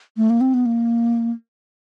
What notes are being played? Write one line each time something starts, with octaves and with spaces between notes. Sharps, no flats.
A3
A#3
C4
B3
A#3